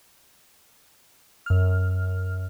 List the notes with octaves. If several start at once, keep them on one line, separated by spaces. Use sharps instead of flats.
F#2 F6